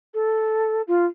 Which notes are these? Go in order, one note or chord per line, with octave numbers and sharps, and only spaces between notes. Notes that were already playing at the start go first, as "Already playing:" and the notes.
A4
F4